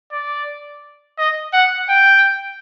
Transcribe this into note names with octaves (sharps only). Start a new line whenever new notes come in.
D5
D#5
F#5
G5